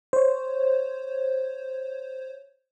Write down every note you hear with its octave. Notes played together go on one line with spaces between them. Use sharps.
C5 C#5